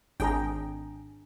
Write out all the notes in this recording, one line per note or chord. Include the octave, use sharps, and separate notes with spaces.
G#1 D4 G#4 G5 A#5